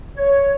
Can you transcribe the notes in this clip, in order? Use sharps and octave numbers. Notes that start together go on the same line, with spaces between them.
C#5